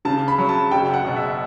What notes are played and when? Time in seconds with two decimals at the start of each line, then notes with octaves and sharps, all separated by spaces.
0.05 C#3 A5
0.28 B5
0.38 F#3
0.49 A5
0.71 F#1 G5
0.94 F#5
1.05 B2
1.16 E5